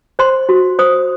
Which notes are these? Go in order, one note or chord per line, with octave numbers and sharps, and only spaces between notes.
C5 C6
F#4
C5 D#6